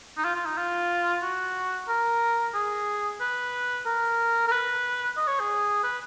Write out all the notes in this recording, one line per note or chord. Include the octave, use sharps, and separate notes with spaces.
D#4
F4
F4
D#4
F4
F#4
A#4
G#4
B4
A#4
A#4
B4
D#5
C#5
G#4
B4